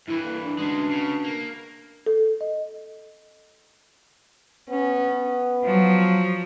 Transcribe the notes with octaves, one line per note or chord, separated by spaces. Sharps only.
G2 E3 E4
D3 A#3 B4
D4
D2 B2 G#3 C#4 D4
C#3
A#3
A4
D#5
B3 C#4
F3 F#3